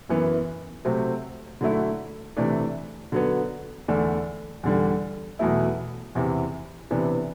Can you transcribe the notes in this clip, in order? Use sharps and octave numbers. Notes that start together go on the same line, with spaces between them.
F#2 E3 B3
C3 F#3 A3 C4
D3 F#3 A3 E4
C3 E3 A3 D4
D3 F#3 B3
E2 D3 A3 D4
E2 D3 G3
E2 B2 F#3 A3 E4
E2 C3 E3
C3 E3 B3 D4